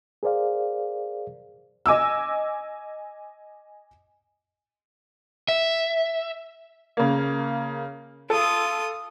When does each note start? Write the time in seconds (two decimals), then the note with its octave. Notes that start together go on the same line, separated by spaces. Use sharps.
0.23 G#4 A#4 C5 D5 F5
1.86 D#5 G#5 D6 E6
5.48 E5
6.97 C#3 A#3
8.30 F4 A4 D#6